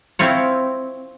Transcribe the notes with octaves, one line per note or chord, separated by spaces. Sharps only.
C4 E4 F4 C#5